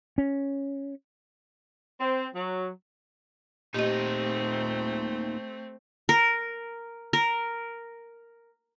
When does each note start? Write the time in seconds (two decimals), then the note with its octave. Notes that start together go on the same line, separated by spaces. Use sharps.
0.18 C#4
1.99 C4
2.34 F#3
3.74 A#2 A3 C4 D#4 G4 D#5
6.09 A#4
7.13 A#4